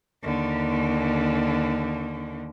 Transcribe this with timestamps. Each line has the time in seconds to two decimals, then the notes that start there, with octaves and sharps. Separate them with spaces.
0.23 D#2 D3